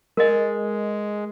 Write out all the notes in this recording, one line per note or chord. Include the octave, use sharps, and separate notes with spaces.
G#3 A#4 D#5